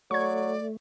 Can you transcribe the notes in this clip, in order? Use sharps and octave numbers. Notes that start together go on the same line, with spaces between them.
F#3 A3 D5 C#6 G#6